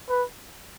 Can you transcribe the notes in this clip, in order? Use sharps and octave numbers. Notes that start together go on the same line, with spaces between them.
B4